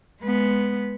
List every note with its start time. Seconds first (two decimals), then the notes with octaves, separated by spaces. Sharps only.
0.22 G#3 B3